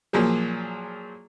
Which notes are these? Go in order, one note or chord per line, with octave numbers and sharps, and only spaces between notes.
A#2 F3 F#3 A#3 G#4